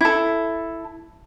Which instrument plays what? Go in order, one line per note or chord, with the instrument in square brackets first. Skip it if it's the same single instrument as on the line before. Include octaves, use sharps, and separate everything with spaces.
[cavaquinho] E4 A4